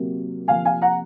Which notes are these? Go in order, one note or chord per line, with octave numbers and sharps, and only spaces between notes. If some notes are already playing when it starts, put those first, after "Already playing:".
Already playing: C3 F#3 A#3
C3 F3 A#3 F5 G#5
F5 G#5
F#5 A#5